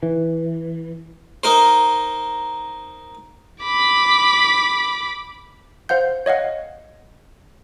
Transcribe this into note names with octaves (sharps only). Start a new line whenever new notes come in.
E3
D#4 A#4 C5
B5 D6
C5 F5 F#5 G6
C#5 D#5 F5 F#5